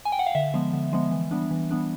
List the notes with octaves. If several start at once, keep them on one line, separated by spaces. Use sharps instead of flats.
G#5
G5
F#5
F5
D3 E5
F3 G#3 B3
D3
F3 G#3 B3
E3
G3 B3 D4
E3
G3 B3 D4